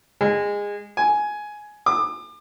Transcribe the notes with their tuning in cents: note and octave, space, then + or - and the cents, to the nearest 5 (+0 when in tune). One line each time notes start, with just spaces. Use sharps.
G#3 -25
G#5 +10
D6 +35